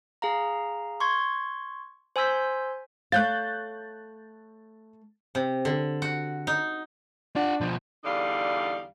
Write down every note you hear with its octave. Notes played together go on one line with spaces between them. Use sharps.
G#4 F5 A#5
C6 C#6 G#6
C5 G#5 C6 E6 G6 B6
A3 C#5 F5 F#6 G6 A6
C3
D3
F#4
D#4
D4 F4 F#5
B2 F3
E2 D3 G3 D#4 F5